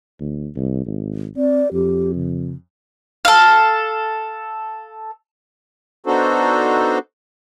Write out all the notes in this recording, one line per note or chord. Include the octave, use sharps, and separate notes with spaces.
D2
C2
G#1
C4 D5
F2 G4
C#3
A4 F5
B3 D4 D#4 F#4 A4 C5